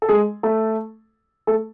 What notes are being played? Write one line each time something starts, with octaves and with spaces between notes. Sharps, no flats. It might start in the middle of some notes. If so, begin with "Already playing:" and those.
A4
G#3 G#4
A3 A4
A3 A4